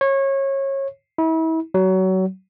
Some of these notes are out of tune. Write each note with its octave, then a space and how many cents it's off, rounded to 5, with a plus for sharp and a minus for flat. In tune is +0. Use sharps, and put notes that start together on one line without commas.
C#5 -25
E4 -35
F#3 +25